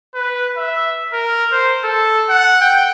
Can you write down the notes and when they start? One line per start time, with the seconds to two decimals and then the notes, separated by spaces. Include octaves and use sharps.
0.14 B4
0.57 E5
1.13 A#4
1.52 C5
1.84 A4
2.29 F#5
2.61 G5